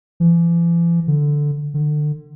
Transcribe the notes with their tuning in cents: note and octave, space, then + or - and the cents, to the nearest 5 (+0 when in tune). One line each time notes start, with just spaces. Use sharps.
E3 +45
D3 +0
D3 +30